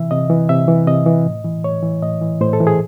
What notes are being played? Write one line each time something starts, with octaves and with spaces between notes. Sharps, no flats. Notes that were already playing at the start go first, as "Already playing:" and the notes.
Already playing: C3 E3 E5
C3 D#5
E3
C3 E5
E3
C3 D#5
E3
A2
E3
A2 C#5
E3
A2 D#5
E3
A2 C5
A4
E3
G#4